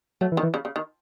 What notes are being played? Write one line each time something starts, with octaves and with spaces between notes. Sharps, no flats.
F#3 A3
E3
D#3
E3
C#3
C#3
D#3